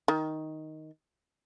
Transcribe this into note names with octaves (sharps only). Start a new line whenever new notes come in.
D#3